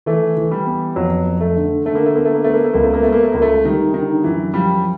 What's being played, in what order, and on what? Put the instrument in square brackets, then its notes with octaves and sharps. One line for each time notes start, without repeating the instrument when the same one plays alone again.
[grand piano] E3 [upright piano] A3
[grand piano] E3
[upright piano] G3
[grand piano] B3
[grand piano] F2 [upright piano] F#3
[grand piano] F2
[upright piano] A3
[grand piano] D3
[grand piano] D3 [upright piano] A3
[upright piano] A#3
A3
[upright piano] A#3 [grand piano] B3
[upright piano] A3
A#3
[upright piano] A3 [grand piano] B3
[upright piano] A#3
A3
[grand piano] C#2 [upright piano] A#3
[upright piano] A3
A#3
[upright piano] A3 [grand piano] B3
[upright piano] A#3
A3
[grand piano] C#2 [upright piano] A#3
[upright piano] A3
[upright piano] D#3 [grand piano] G3
[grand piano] D3 [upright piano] D#3
[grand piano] F#2 [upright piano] E3
[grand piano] F3 [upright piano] G3